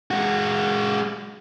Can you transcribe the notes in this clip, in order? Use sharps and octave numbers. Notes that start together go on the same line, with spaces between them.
G#3 F#4